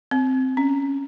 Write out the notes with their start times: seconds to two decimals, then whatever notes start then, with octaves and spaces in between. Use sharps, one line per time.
0.11 C4
0.57 C#4